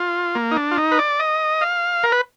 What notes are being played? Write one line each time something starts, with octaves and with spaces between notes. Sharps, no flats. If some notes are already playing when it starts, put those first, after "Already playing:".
Already playing: F4
A#3
D#4
D4
F4
D#4
B4
D5
D#5
F5
A#4
B4